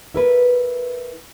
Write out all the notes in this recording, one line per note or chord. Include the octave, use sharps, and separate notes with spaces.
E4 A#4 B4